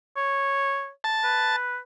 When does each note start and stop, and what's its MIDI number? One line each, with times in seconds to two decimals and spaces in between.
0.16 0.90 73
1.04 1.56 81
1.24 1.78 71